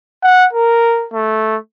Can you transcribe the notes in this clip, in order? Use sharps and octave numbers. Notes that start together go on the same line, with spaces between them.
F#5
A#4
A3